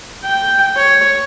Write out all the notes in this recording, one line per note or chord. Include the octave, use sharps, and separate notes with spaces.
G5
C#5